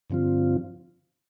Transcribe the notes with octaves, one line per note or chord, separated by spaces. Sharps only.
G2 D3 F3 C4 F4